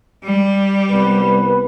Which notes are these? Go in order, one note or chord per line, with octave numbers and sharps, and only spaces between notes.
G3
C2 B3 B4